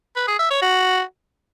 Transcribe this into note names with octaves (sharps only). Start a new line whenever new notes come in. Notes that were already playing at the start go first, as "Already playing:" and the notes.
B4
G#4
E5
C#5
F#4